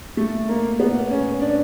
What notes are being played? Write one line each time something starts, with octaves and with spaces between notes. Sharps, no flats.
A3
A#3
B3
C#4
D4